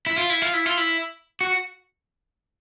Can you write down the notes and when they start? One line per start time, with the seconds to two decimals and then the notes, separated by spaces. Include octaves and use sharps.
0.06 E4
0.18 F4
0.30 E4
0.42 F4
0.54 E4
0.66 F4
0.77 E4
1.41 F#4